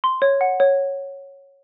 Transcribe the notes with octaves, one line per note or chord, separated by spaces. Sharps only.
C6
C#5
F#5
C#5